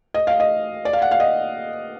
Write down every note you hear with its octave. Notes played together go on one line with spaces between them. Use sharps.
D#5
F5
D#5
D5
F5
F#5
F5
D#5